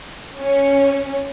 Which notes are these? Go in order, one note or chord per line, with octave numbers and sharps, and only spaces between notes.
C#4